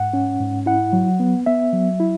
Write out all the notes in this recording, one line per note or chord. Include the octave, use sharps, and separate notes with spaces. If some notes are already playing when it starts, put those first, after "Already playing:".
Already playing: G#2 F#5
C#4
G#2
E4 F#5
F#3
B3
B3 E5
F#3
E4